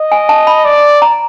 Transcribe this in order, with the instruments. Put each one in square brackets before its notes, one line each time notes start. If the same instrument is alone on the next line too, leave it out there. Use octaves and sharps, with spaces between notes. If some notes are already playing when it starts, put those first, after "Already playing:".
Already playing: [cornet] D#5
[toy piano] G#5
A5
B5
[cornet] D5
[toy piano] A#5